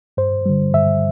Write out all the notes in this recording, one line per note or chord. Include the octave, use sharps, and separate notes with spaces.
G2 C5
D3 G3
G2 E5